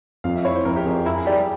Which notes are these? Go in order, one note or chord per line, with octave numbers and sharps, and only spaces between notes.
F2 F5
E5
E4 C#5
C5
F2 A#4
G4
F2 G#4
E4 A#4
G#4
G3 G4
G#4